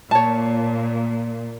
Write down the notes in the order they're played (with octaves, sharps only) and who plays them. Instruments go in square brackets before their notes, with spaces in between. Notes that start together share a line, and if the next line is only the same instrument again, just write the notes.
[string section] A#2 [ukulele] C#5 A5